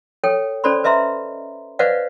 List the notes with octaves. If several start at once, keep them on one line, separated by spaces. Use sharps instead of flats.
A4 C#5 G5
C#4 A4 C5 D5 B5 C6
B4 D#5 E5 A#5 C6
B4 C5 D5 D#5 F5 F#5